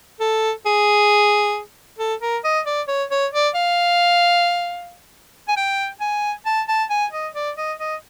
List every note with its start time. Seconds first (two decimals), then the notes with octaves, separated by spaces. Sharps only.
0.20 A4
0.66 G#4
1.99 A4
2.22 A#4
2.44 D#5
2.66 D5
2.88 C#5
3.11 C#5
3.33 D5
3.55 F5
5.48 G#5
5.57 G5
6.01 G#5
6.46 A5
6.68 A5
6.90 G#5
7.12 D#5
7.35 D5
7.57 D#5
7.80 D#5